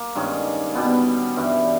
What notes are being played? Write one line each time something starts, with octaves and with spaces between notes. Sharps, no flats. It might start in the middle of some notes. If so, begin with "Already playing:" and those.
Already playing: A#3
G2 D#3 G#3 C#4
B2 G3 B3
G2 E3 G3